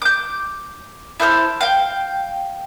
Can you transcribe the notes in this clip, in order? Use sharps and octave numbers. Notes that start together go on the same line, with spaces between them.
D6 G6
E4 A4 C5 F6
F5 G5